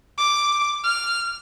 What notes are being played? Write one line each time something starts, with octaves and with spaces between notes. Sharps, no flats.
D6
F6